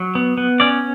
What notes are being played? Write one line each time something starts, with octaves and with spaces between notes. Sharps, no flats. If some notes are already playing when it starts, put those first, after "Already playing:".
Already playing: F#3
B3
B3
C#4 D5